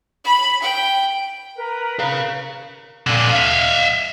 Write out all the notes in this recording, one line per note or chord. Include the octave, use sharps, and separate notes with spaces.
B5
G5
A#4 B4
G#4 F5
A#2 D3
E5 F5